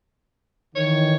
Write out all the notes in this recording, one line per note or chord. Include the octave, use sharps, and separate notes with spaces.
D#3 E3 C#5